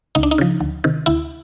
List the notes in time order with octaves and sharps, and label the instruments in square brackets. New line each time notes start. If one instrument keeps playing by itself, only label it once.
[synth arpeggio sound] C#2 D#4
D4
D#4
C#3 F3
D2
C3 D#3
D2 E4